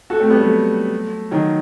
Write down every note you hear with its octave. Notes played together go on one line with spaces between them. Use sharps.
F#4 A4
A3 C4
G3 B3
F#3 A3
D#3 F#3